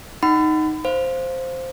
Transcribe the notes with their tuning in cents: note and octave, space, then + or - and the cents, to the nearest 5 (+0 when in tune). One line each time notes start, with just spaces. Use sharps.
D#4 +0 F#5 +15 B5 +40
C5 +0 F5 +0